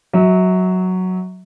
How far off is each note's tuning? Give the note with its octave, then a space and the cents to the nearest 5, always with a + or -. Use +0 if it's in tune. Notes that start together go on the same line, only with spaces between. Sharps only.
F#3 +0 E5 -35